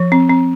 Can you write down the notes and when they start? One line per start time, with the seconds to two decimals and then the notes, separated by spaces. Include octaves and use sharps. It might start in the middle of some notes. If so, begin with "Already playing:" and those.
Already playing: F3
0.12 C4
0.30 C4